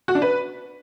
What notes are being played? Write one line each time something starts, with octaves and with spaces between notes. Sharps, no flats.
F#4
D4
B4